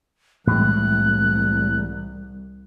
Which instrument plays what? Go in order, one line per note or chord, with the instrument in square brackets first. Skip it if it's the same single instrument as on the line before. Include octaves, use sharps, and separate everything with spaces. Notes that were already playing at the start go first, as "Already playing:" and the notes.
[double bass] C2 [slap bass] A2 E3 G#3 [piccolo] F#6